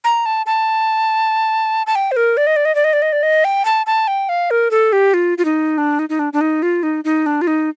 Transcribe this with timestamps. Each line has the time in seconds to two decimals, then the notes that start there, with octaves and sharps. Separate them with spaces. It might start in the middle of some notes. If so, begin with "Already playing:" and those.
0.04 A#5
0.26 A5
0.46 A5
1.87 A5
1.95 G5
2.11 C5
2.16 A#4
2.37 D5
2.47 D#5
2.56 D5
2.65 D#5
2.75 D5
2.84 D#5
2.93 D5
3.02 D#5
3.12 D5
3.23 D#5
3.44 G5
3.65 A5
3.86 A5
4.08 G5
4.29 F5
4.51 A#4
4.71 A4
4.93 G4
5.14 F4
5.38 F4
5.45 D#4
5.78 D4
5.99 D#4
6.09 D#4
6.19 D4
6.33 D4
6.41 D#4
6.62 F4
6.83 D#4
7.05 D#4
7.26 D4
7.42 F4
7.47 D#4